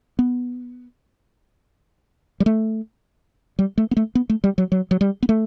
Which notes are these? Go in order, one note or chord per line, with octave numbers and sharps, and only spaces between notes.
B3
G3
A3
G3
A3
B3
A3
B3
A3
G3
F#3
F#3
F#3
G3
B3
A3